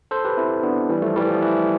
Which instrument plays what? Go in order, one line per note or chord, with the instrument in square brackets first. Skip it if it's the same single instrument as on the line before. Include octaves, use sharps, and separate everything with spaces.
[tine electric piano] A4 C5
G4 B4
C4 E4
B3 D4
E3 G3
F3 A3
E3 G3
F3
E3